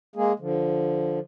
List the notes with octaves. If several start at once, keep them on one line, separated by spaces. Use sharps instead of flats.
G#3 A#3 G#4
D3 F3